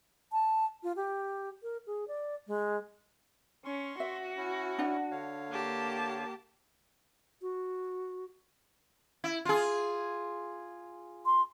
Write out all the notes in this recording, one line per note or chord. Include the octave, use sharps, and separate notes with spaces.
A5
F4
G4
A#4
G#4
D5
G#3
C#4 C6 C#6
F#4 E5
C#4 E4
D4 F#5
D3 C#5 F5
A#3 G4 A5
F#4
E4
F4 G#4
C6